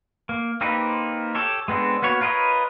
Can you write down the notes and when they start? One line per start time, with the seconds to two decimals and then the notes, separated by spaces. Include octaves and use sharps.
0.29 A#3
0.61 A#3 C4 D#4 G4 B4
1.35 G4 A4 C#5
1.68 G#3 B3 C4 D4 A4
2.02 A#3 B3 F#4 C#5
2.21 F4 A#4 B4 C#5 D#5